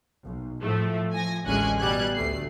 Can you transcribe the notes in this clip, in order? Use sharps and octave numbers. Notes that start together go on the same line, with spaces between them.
B1
A2 F3 A3
F3 G#5 A#6
A1 D2 G#3 C#4 G#5 F#6
B2 G3 F#6 G#6
D2 A3 C7